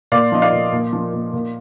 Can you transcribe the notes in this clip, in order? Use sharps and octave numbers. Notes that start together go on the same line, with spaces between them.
A#2 D5 F5
F3 D#5
D5 F5
A#2
A#2
F3
A#2
A#2